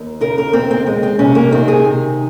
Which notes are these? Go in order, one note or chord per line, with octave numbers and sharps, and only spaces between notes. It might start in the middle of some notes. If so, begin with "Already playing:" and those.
Already playing: D#2
C#3 A#4
A#4
D#2 C4
C4
G#3 C4
C4
C3 C#4
A#3
D#3 C4
G#4
C3